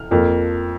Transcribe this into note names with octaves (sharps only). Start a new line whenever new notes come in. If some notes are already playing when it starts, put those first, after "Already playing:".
Already playing: F6
F2 F3 A#3